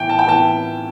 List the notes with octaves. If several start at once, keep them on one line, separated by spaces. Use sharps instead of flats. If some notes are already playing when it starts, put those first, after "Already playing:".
Already playing: A2 E3 B3 G5
A5
G5
A2 E3 B3 A5